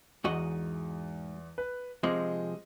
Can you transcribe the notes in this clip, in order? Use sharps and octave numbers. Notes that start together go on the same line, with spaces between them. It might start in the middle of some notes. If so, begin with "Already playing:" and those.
E2 G#2 F#4 D#5
B4
C3 F3 G#3 D#5